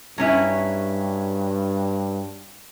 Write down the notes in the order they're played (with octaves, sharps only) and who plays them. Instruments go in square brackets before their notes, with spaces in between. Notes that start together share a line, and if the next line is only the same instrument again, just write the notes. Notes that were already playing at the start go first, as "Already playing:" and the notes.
[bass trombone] G2 [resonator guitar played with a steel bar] F#3 C#4 E4